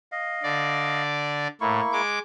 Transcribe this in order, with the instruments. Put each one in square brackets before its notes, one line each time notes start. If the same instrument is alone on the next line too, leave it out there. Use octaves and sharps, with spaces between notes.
[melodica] D#5 F5
[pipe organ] D3 D5
[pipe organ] A2 [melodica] A#3 E4 C#6
[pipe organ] G#3 D6